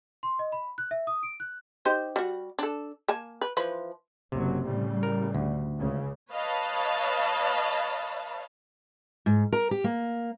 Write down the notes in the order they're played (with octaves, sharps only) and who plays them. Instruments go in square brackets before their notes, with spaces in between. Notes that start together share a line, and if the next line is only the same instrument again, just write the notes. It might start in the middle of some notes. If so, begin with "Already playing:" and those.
[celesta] C6
D#5
B5
F#6
E5
D#6
D7
F#6
[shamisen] D#4 G4 C5
G3 F#4
D4 A4
A#3 G#5 A5
B4
E3 F3 B4
[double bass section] F#1 F#3 [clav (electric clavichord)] C3
[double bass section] A2 C#3 G3
[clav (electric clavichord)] A#4
D2
[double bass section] C#2 C#3
[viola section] B4 C#5 D#5 F5 A5 B5
[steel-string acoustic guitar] G#2
A#4
G4
A#3